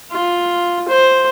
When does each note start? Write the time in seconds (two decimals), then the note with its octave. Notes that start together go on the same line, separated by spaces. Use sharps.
0.11 F4
0.89 C5